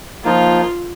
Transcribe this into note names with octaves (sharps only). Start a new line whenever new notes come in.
F3 A#3 D#4 F4